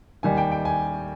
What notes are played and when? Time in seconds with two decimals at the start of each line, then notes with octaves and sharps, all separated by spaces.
0.23 D#2 D#3 G3 G#5
0.38 G5
0.52 G5
0.65 G#5